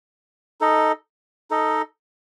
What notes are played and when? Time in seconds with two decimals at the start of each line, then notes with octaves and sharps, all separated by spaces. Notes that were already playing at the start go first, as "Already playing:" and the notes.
0.61 D#4 A4 D#5
1.51 D#4 A4 D#5